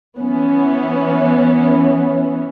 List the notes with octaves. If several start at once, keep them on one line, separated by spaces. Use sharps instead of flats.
E3 B3 C#4